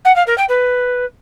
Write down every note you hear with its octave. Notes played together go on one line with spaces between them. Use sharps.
F#5
F5
A#4
G5
B4